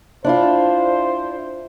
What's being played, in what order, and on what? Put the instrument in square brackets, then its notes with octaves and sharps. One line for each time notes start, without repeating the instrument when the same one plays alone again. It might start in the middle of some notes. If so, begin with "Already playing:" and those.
[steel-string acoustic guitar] D4 E4 F4 [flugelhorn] C5